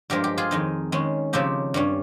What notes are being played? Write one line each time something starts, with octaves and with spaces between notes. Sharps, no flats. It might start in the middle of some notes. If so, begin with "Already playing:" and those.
G2 F3 G#3 G4 A#4
G4
F4 G#4
F2 D#3 G#3 D#4
D#3 G#3 C#4
C#3 F3 C4 D#4 G4
G2 G3 C#4